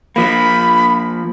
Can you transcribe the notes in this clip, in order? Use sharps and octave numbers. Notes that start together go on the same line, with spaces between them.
F3 A#3 B5